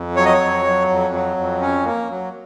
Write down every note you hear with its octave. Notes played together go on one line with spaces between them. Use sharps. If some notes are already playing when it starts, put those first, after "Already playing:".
Already playing: F2
F#3 C#5
D#5
C#5
F2
F#3
F2
F#3
F2
C#4
A#3
F#3